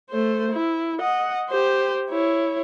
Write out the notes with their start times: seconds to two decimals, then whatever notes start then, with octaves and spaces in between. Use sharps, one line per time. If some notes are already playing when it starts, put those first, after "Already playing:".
0.11 A3 C5
0.52 E4
1.01 D#5 F#5
1.50 G4 C5
2.10 E4 C#5